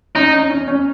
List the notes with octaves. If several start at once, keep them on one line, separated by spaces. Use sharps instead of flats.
C#4 D#4
C#4
C#4
C#4